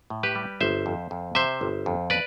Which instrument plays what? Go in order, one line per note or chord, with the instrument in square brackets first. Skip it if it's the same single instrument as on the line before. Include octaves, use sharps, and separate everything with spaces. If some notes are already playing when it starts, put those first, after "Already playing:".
[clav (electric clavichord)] A2
G4 B4
G3
G1 C5 E5
F2
F2
C3 C5 E5
G1
F2
B4 D5